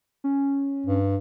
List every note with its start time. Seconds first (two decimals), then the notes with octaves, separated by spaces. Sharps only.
0.24 C#4
0.86 G2